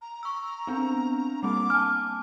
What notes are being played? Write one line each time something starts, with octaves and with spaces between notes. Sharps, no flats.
A#5
C#6 E6
B3 C4 D4
G3 A#3 C4 D6
G#5 A5 F6